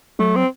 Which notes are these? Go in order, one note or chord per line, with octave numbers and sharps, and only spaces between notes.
F#3 A3
C4